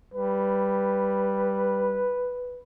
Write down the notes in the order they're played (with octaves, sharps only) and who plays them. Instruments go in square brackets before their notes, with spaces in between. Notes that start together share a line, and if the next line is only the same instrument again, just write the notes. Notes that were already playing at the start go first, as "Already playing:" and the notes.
[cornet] G3 [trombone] B4